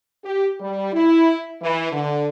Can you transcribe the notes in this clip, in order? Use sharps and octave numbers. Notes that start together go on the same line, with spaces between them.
G4
G3
E4
E3
D3